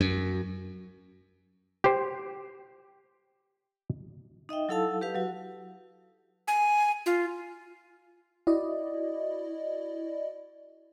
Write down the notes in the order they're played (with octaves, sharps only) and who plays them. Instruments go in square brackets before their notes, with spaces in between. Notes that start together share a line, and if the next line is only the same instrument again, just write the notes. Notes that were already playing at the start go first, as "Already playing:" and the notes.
[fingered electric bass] F#2
[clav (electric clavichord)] G4 C5
[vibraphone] D#4 D#5 E5 G5
F#3 E4 A4 F5 A5 E6
G4 B4 F5
F#3 F#4
[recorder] G#5
F4
[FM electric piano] E4 F#4 D5 D#5